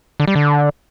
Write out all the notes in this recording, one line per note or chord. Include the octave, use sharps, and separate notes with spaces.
D3
G3
D3